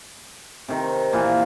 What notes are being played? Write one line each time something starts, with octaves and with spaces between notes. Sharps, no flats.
C3 D#3
A#2 E3